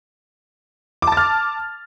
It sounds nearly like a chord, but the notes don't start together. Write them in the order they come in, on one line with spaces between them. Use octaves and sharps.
D6 A5 A6 F6